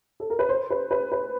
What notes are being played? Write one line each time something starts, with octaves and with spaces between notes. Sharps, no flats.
A4
A#4
B4
C5
B4
B4
B4